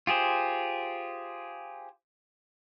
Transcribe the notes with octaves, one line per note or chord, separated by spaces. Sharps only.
F4 G4 G#4 C5